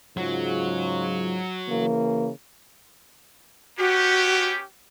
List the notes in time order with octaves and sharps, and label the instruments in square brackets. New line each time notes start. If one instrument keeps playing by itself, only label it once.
[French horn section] G#2 C#3 F4 [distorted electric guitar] F#3
[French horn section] C#3 E3 A#3
[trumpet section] B3 C#4 G4 [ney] F#4